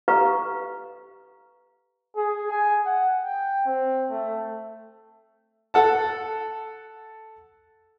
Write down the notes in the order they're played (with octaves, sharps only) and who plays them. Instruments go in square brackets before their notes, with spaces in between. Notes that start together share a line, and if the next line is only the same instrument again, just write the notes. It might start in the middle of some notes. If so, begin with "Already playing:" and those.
[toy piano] G4 A4 B4 F5 A#5 C#6
[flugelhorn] G#4
G#5
F#5
G5
C4
A3
[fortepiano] A4 F#5 A5